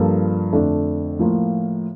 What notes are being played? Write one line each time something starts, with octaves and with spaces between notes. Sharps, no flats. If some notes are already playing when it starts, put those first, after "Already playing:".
Already playing: G2 F3 A#3 F4 A4
F2 D3 A3 D4
A2 F3 A#3 F4